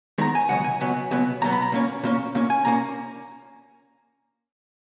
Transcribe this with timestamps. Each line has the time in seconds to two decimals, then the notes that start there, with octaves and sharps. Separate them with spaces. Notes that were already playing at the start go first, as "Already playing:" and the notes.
0.18 E2 D#3 G#3 B3 A#5
0.35 G#5
0.49 C#2 B2 F#3 B3 F#5
0.64 G#5
0.80 C#2 B2 F#3 B3
1.11 C#2 B2 F#3 B3
1.42 C#2 B2 F#3 B3 A#5
1.52 B5
1.62 A#5
1.72 A#2 A#3 C#4
2.03 A#2 A#3 C#4
2.35 A#2 A#3 C#4
2.50 G#5
2.65 A#2 A#3 C#4 A#5